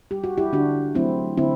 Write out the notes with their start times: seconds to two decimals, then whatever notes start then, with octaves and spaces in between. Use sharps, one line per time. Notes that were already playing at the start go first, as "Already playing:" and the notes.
0.11 G3 G4
0.24 F#4
0.38 E4 G4
0.53 D3 D4 F#4
0.95 F#3 A3 C4 E4
1.37 D3 C4 E4